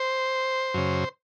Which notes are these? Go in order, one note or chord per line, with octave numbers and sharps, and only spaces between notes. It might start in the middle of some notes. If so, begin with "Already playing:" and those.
Already playing: C5
F#2 C#3